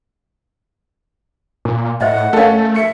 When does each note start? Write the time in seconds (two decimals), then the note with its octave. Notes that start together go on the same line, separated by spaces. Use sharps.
1.65 A#2
2.01 A2 C5 D#5 E5 F#5
2.33 A3 C#4 A4 A#4 F5
2.76 E5 C#7